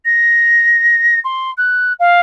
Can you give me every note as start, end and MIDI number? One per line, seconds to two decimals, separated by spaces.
0.05 1.19 94
1.24 1.51 84
1.57 1.92 90
1.99 2.21 77